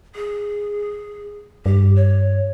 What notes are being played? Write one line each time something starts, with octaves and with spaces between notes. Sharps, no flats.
G#4
G2 G4
C#5